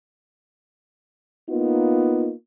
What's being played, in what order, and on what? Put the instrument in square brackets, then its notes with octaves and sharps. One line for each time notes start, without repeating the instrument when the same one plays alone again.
[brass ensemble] A#3 B3 D#4 F4